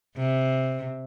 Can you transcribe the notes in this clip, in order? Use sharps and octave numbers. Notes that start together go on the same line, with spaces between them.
C3